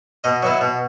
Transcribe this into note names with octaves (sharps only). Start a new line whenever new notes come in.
B2 D#5
F#3 B3 E4
B2